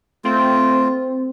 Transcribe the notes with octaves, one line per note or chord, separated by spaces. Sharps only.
A3 C4 F4